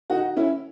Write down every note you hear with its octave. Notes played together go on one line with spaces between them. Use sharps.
D#4 F#4
C#4 E4